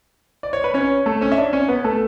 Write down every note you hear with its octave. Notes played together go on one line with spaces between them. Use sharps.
D5
C#5
B4
C#4 C#5
A3 A4
C#4 C#5
E5
D4 D5
C#4 C#5
B3 B4
A3 A4